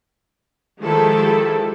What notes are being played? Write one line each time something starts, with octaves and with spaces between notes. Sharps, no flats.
D#3 F3 G#3 E4 G4 A4